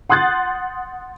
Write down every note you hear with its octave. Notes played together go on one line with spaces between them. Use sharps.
F#5 C6 D#6 F#6 G6 A6